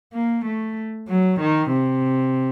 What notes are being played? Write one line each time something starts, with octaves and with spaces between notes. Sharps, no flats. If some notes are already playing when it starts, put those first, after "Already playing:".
A#3
A3
F#3
D#3
C3